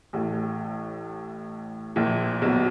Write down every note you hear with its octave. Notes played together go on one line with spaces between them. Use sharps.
A1 A2
A#1 A#2
B1 B2